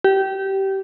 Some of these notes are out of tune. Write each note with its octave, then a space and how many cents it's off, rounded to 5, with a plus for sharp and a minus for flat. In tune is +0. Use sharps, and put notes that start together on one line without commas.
G4 -20